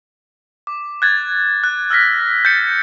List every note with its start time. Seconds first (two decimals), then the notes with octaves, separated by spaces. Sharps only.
0.67 D6
1.02 F#6 G#6 A6
1.64 F#6
1.90 E6 F6 A#6 B6
2.45 G6 A6 C#7